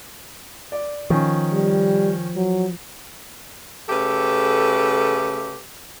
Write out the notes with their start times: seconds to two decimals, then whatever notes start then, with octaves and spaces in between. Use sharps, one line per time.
0.72 D5
1.10 D#3 F3 C#4
1.53 G3
2.36 F#3
3.89 C#3 A3 G4 A4 B4